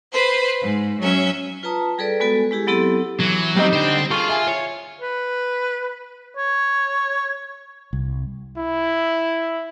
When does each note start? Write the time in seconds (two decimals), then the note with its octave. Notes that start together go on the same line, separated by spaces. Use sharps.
0.12 B4 C5
0.62 G#2
1.00 F#3 C#4 E5
1.63 F4 B4 A5 A#5 D#6
1.98 G3 G#4 A4 B4 D5
2.20 G#3 B3 F#4 A4 G#5
2.51 G#3 E4 G4 G#4
2.67 F#3 B3 C4 E4 G4 A4
3.20 E3 F#3
3.56 G3 C4 D#4
3.73 D3 C5 G5
4.11 F4 G#4 A4 C#6
4.29 E5 G#5
4.47 C#5
5.01 B4
6.37 C#5
7.93 C2
8.58 E4